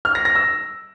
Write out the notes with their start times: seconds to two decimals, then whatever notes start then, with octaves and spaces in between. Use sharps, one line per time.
0.05 F6
0.15 A#6
0.25 A#6
0.35 E6